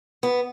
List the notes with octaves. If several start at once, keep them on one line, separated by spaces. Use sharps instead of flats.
B3